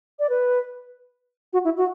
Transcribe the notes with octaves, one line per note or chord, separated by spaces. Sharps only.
D5
B4
F#4
E4
F#4